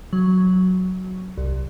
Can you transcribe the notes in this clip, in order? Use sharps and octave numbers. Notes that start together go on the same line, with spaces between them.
F#3
C2